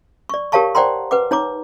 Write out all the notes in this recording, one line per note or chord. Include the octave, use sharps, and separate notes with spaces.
D5 C#6
G4 A#4 C#5 F5 A5 C#6
C5 D5 F#5 G5 A#5 C6
B4 F#5 D6
D#4 C#5 A#5 D6